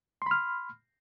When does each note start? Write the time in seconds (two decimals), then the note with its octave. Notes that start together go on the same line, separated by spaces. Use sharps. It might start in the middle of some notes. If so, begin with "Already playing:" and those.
0.22 C6
0.26 B5
0.31 F6